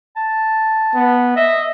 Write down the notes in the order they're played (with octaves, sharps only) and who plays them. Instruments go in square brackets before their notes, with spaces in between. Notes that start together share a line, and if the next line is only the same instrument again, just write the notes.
[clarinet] A5
[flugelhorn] B3
[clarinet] D#5 [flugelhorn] E5